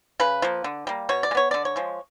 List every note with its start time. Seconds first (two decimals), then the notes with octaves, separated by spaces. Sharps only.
0.20 C#3 B4
0.42 F3 A#3
0.64 D3
0.87 G3 A#3
1.09 B2 C#5
1.23 D5
1.31 G#3
1.35 B3 C#5
1.51 D3 D5
1.65 C#5
1.76 F3 G#3